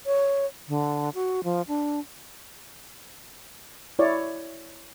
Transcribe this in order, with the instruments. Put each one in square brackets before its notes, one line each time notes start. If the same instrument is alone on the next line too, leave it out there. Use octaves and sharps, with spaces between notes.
[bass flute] C#5
D3
F#4
F3
D4
[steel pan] E4 C#5 D5